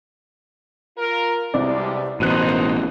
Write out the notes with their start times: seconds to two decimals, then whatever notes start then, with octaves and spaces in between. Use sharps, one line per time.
0.98 F4 A#4
1.54 C2 B2 G3 G#3 C4 D5
2.20 A1 B2 D#4 A#4 C5 F#6 D#7